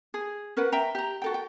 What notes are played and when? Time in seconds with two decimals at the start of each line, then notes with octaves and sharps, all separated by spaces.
0.14 G#4
0.57 C#4 A#4 B4 F#5
0.72 E5 G5 A#5
0.95 G4 A#5
1.22 F#4 A4 G5
1.34 G5